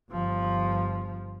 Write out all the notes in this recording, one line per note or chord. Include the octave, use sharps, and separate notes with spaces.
G1 F3